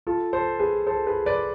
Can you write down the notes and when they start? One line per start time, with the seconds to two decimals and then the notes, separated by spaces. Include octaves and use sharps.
0.07 F4 A4
0.33 A4 C5
0.59 G#4 B4
0.87 A4 C5
1.06 G#4 B4
1.26 B4 D5